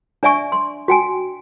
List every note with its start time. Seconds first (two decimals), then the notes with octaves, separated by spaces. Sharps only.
0.23 D4 D5 E5 G#5 C#6
0.52 C6
0.88 F#4 G5 G#5